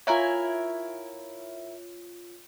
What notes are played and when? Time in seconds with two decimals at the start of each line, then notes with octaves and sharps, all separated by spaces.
0.07 E4 F4 A#4 C#5 G#5